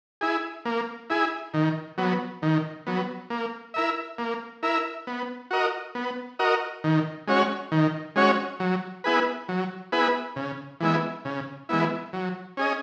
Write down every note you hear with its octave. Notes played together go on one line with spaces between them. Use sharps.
E4 G#4
A#3
E4 G#4
D#3
F#3 B3
D#3
F#3 B3
A#3
E4 A#4 E5
A#3
E4 A#4 E5
B3
F#4 A#4 D#5
B3
F#4 A#4 D#5
D#3
G#3 C#4 F#4 C#5
D#3
G#3 C#4 F#4 C#5
F#3
B3 E4 G#4 B4
F#3
B3 E4 G#4 B4
C#3
E3 G#3 B3 E4
C#3
E3 G#3 B3 E4
F#3
C#4 G#4 D#5